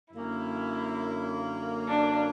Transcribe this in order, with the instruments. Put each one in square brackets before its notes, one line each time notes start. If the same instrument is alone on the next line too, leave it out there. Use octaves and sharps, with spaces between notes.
[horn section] F#2 D3 A#3 C#4 [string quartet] E4
[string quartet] D4